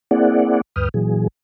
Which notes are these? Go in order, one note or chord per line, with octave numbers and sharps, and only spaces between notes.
A#3 C4 E4 G#4 D5 F#5
D2 G2 B4 G5 D#6 F6
A#2 E3 F#3 G#4